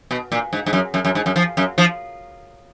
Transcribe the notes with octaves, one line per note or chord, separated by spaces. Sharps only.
B2
A#2
G#2
G#2
F#2
F#2
F#2
G#2
F#2
F3
F#2
F3